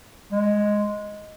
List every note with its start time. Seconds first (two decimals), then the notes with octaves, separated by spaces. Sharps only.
0.32 G#3